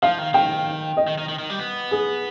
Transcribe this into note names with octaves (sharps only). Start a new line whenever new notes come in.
F3 F5
D#3
D#3 G5
D#5
D#3
D#3
D#3
D#3
G3
B3
G#4